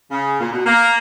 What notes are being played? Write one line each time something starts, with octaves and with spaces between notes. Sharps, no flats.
C#3
A#2
B2
A#3